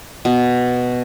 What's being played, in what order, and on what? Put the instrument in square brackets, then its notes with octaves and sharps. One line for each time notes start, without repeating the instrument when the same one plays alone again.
[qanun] B2